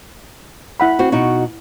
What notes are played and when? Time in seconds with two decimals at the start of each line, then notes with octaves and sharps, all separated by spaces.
0.80 E4 F#5 B5
0.99 C4 F#4
1.12 B2 D#4 F#4